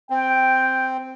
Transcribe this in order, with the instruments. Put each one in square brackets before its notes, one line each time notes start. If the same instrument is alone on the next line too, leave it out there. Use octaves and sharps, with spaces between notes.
[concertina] C4 [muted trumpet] G5